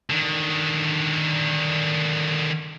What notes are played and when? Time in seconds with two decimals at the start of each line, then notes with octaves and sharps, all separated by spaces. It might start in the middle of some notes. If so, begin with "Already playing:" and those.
0.10 D3 D#3